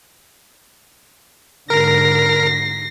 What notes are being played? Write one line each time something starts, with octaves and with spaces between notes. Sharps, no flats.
G#2 D3 A#4 A#6 C7